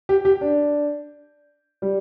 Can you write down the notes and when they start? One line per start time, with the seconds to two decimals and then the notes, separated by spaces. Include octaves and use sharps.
0.09 G4
0.25 G4
0.41 D4
1.82 G3